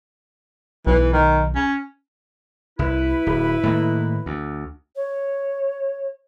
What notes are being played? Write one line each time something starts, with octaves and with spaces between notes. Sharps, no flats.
B1 E3
D#3
C#4
C2 E4 B4
D1
A2 D#3 A#3
D2
C#5